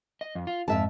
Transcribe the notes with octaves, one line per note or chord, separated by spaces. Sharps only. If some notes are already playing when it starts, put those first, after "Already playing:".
D#5
F2
F4
F2 G#2 E5 A5